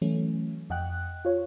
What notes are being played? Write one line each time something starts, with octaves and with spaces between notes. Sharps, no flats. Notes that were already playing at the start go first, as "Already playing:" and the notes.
E3 F#3 A3 C#4
F2 D#5 F#5 G5 F#6
F4 C#5